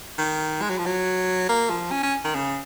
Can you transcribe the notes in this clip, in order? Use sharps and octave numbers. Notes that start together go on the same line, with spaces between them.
D#3
G#3
F#3
F3
F#3
A#3
F3
C#4
C#4
D#3
C#3